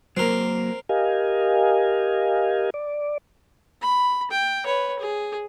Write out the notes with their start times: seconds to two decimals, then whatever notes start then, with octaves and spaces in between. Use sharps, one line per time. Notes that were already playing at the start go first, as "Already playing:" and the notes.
0.17 F#3 A#3 C4 A#4
0.89 G4 A#4 D#5 F5 G#5
2.74 D5
3.82 B5
4.31 G5
4.65 B4 C#5
4.99 G#4